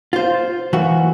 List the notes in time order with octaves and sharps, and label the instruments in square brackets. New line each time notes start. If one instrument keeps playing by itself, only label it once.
[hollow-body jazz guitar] F4 C5
E3 A#3 F#4